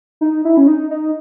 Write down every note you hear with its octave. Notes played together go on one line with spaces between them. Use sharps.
D#4
E4
C#4
D#4
D#4